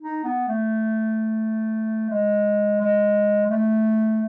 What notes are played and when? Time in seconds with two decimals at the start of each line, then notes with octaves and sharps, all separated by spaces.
0.01 D#4
0.24 B3
0.48 A3
2.10 G#3
2.81 G#3
3.46 G#3
3.50 A3